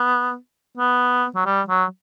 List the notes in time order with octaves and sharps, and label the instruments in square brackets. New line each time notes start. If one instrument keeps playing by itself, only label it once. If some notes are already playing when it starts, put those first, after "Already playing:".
Already playing: [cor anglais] B3
B3
F#3
G3
F#3